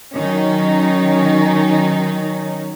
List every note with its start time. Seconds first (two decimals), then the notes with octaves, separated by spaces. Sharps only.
0.14 D#3 F#3 C#4 D#4